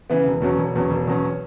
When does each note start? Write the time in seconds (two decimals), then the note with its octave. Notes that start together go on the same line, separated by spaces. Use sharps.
0.10 C#3 E3 B3
0.27 E1
0.42 E2 B2 F#3 C#4
0.59 E1
0.75 E2 B2 F#3 C#4
0.91 E1
1.08 E2 B2 F#3 C#4